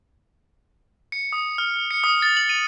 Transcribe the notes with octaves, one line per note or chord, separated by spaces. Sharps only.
C#7
D#6
F6
C#7
D#6
A6
F#7
D#7